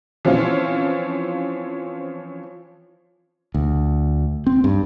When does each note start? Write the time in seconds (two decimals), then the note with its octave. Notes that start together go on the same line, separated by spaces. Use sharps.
0.25 E3 F3 C4 C#4 F4
3.54 D2
4.47 C4
4.64 G2